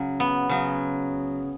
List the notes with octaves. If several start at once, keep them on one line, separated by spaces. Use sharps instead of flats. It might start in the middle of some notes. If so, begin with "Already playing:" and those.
Already playing: C#3 F#3
B3
C#3 F#3